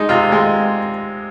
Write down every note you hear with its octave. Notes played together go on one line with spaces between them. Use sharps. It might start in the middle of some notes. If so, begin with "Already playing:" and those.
Already playing: G#3 D#4
C3 F4
G#3